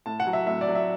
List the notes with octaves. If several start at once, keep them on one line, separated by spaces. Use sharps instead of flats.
A2 A5
F#5
F#3
E5
A2 E5
D5
F#3
E5